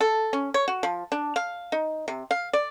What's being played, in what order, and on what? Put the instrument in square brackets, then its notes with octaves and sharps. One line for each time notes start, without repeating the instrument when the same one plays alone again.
[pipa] A4
C#4
C#5
F#4
F3
D4
F5
D#4
C3
F5
D5